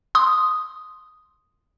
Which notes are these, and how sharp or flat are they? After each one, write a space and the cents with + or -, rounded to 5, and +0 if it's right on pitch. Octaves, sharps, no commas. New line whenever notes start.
C6 +0 D#6 +0